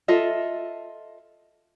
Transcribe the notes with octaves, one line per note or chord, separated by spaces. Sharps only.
F4 A4 D#5 E5